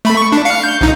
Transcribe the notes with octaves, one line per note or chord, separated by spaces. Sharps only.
A3 B5
C#6
D4
F5 C#7
G6
A#1 D#4